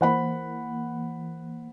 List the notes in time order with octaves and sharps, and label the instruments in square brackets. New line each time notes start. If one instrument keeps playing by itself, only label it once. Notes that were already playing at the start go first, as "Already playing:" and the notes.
[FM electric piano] E3 A#3 [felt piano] C5 F#5 B5